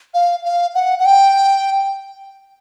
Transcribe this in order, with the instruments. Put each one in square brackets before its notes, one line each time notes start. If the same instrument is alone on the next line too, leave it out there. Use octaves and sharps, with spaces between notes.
[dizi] F5
F5
F#5
F#5
G5